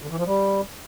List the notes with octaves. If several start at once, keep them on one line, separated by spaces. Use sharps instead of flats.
D3
E3
F3
G3